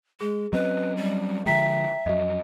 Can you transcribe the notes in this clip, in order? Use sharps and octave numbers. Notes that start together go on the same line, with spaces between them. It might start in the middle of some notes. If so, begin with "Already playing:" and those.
G#3 G#4
F#3 C4 C#4 B4 D#5
G3
D3 F3 G#3 E5 G5 A#5 B6
F2 F#3 D#5